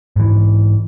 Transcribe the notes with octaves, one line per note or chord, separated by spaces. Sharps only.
G#2 E3